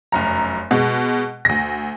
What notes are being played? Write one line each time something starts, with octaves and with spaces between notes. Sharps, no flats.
F1 F#2 A#5
B2 G#3
D2 A#6